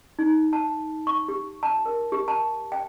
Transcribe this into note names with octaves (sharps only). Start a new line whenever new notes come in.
D#4
A5
C#6
G4
A5
A#4
G4
A5
G5